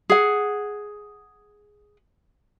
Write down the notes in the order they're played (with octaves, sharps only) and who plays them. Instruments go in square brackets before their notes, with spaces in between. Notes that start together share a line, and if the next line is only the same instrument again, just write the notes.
[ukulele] G#4 F#5